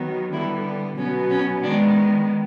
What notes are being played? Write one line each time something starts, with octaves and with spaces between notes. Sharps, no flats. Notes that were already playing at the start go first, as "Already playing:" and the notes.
Already playing: D#3 F#3 B3
D3 G3 B3 E4
B2 F#3 B3 C#4
C#4
D#3 G#3 B3 D4